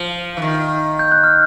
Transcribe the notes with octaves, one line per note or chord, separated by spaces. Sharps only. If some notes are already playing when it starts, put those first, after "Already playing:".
Already playing: F3
E3
D#3
G6
F#6
F6